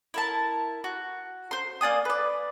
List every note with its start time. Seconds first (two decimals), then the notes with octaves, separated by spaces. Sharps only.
0.14 E4 A#4 A5
0.84 F#4
1.51 C5 C6
1.81 A#3 D5 G#5 D#6
2.05 B4 D5